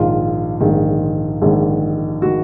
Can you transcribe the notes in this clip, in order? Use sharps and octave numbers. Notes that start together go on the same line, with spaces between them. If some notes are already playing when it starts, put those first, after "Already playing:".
Already playing: A#1 G#2 D#3 F4
A#1 G#2 D#3
A#1 G#2 D#3
D#3 F#4